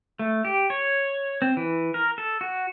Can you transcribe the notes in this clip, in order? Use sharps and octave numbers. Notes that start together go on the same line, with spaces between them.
A3
G4
C#5
C4
E3
A#4
A4
F#4